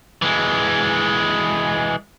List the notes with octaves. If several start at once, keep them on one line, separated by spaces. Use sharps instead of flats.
E3 G#3